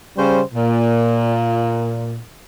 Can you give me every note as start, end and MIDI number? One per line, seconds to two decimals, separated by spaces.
0.17 0.41 49
0.17 0.41 55
0.17 0.41 61
0.17 0.41 72
0.54 2.17 46